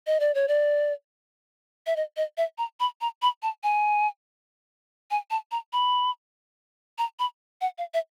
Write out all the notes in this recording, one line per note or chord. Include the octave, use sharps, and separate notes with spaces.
D#5
D5
C#5
D5
E5
D#5
D#5
E5
A#5
B5
A#5
B5
A5
G#5
G#5
A5
A#5
B5
A#5
B5
F#5
F5
E5